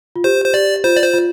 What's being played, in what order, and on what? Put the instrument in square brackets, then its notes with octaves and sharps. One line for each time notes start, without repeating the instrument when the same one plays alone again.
[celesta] F4
[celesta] G4 [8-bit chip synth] C5
[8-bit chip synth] C5
[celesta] G4 [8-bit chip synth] D5
[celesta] F4 [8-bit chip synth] C5
[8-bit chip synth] D5
C5
[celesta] F4